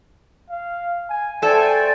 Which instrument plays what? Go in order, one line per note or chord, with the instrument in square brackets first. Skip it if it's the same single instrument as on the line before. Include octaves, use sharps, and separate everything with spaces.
[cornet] F5
G#5
[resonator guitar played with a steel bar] A3 A4 [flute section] C5 D5 G#5 [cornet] G5